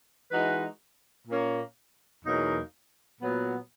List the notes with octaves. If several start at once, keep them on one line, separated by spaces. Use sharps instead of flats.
E3 G#3 D#4 F#4 B4
A#2 A#3 C#4
E2 B2 F#3 A#3 D#4
A#2 F#3 B3